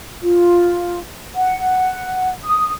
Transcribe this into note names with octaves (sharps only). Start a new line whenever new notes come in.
F4
F#5
D#6